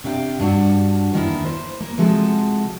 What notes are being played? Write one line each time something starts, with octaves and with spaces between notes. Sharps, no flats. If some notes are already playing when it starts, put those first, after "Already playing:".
C3 D4 F5 G5
G2 D4 F#4
D#2 D#3 A#3 D4 E4
C5
A#3
C3 F3 G#3 F#4 A4